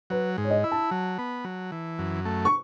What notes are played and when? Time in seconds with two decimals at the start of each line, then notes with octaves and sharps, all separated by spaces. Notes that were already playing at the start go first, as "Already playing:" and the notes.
0.10 F#3 B4
0.38 G#2
0.44 C#5
0.50 D#5
0.64 E4
0.72 A5
0.91 F#3
1.19 B3
1.44 F#3
1.72 E3
1.99 F#2
2.25 A3
2.45 C#6